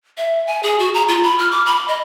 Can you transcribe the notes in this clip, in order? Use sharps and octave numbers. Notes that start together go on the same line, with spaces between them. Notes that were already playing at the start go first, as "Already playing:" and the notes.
E5
G#5
G#4
F#4
A#5
F4
B5
F6
D6
B5
D#5